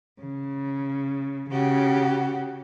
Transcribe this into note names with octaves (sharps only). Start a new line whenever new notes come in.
C#3
C#3 F#4 G4